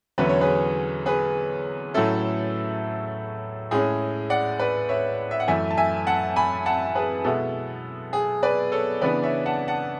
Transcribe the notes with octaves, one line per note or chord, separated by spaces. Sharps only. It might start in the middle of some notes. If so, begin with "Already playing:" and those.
E2 D3 F#3 C#4 E4 B4
C#5
G#4 B4
G#4 B4
A2 F#3 A3 C#4 E4 A4
A2 G#3 C#4 G#4
D5 F#5
B4 D5
C#5 E5
E5
F#5
F#2 E3 A3 E4 E5 G#5
A5
E5 G#5
F#5 A5
G#5 B5
F#5 A5
G#4 B4
B2 G#3 B3 E4 A4
G#4
B4 D5
A4 C#5
C#3 E3 B3 D4 B4 D5
C#5 E5
F#5 A5
F#5 A5